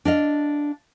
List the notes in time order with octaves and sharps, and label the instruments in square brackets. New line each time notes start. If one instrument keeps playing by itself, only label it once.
[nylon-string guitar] D4 D#5 F5